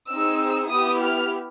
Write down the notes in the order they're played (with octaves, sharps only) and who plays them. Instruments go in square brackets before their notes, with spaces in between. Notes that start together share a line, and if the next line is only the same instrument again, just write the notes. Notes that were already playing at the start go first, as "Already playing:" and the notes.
[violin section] C4 D#4 G#4 E6
B3 E4 G4 D#6
F6